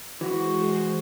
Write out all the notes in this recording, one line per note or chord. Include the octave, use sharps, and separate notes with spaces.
E3 G#3 F#4 G#4 C5